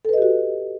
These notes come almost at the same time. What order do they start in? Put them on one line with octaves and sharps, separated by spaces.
A4 B4 D#5 G4 F#4